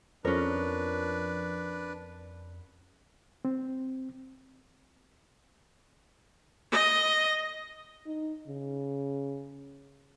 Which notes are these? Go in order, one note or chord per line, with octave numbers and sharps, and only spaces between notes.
F2 C#4 D4 A#4 B4
C4
D#5
D#4
C#3